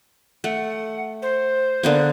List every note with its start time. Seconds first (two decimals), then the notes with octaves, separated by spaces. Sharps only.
0.44 A3 F#5
1.22 C5
1.83 D3 A#3 B3